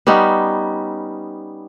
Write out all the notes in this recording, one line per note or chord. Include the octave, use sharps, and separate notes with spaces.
G3 B3 C#4 D#4